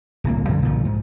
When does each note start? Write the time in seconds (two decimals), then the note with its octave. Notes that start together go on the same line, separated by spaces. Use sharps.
0.24 D1 C2 A#3
0.49 F#2 D3 F3 G3
0.62 B1 A#2 D3 F3
0.85 G#2